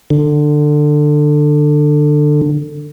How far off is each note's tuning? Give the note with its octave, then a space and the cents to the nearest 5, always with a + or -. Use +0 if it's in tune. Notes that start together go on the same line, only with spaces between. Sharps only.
D3 +20